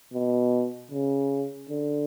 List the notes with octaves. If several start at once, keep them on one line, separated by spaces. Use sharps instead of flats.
B2
C#3
D3